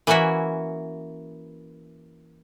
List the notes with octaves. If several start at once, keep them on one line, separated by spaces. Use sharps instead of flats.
E3 A#3 C#4 E4 F#4 E5